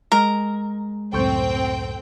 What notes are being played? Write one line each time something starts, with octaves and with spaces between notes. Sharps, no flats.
G#3 A#4
C#2 F#2 A2 C4 A4 G5 C#6 G6